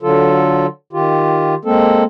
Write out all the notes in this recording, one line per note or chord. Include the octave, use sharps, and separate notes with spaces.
D3 F#3 F4 A4
D#3 F4 G4
G#3 A#3 C4 A4